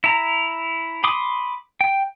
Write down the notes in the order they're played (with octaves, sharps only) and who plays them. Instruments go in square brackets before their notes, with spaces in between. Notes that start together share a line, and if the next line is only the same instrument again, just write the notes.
[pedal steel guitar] E4 A#5
B5 C6 D6 D#6
G5